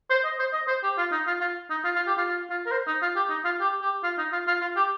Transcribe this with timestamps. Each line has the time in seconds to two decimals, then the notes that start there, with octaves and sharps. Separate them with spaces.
0.10 C5
0.24 D#5
0.39 C5
0.53 D#5
0.68 C5
0.83 G4
0.98 F4
1.12 D#4
1.27 F4
1.41 F4
1.70 D#4
1.84 F4
1.96 F4
2.07 G4
2.18 F4
2.28 F4
2.50 F4
2.66 A#4
2.72 C5
2.87 D#4
3.02 F4
3.16 G4
3.30 D#4
3.45 F4
3.60 G4
3.82 G4
4.03 F4
4.18 D#4
4.32 F4
4.47 F4
4.61 F4
4.76 G4